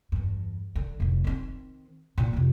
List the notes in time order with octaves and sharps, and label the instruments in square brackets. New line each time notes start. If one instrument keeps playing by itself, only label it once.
[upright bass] E2 G2
D3
F1 A2
D#3 C4
A#2 D4
F2 C3